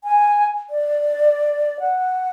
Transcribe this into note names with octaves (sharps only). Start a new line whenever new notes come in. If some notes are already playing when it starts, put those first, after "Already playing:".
G#5
D5
F#5